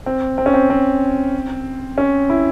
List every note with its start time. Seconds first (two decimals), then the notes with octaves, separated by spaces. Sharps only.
0.06 C4
0.38 C4
0.46 C#4
0.54 C4
0.70 C4
1.98 C#4
2.29 E4